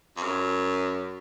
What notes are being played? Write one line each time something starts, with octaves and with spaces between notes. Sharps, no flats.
F2
F#2